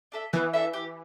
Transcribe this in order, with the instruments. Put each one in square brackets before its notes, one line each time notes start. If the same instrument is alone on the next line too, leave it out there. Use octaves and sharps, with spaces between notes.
[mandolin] D4 A4 E5
[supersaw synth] E3 [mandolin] B3
[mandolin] D4 A4 E5
G4